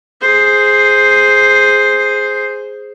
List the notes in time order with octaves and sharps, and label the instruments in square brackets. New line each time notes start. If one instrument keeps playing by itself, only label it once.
[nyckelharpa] G#4 C5